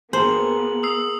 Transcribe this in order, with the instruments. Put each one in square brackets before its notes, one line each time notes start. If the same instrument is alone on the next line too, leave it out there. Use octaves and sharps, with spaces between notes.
[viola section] A#3 B3 [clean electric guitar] G#4 A#4 [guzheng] C5 [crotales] F#7
[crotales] D#6 E6 C7